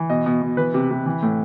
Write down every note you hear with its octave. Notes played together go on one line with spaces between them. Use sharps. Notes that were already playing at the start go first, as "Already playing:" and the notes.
Already playing: E3
B2 D#5
B2
B2
E3 B4
C3
C3
E3
A2